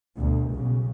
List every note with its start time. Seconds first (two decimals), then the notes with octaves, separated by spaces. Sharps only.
0.16 G1 D2 B2
0.52 B1 C#3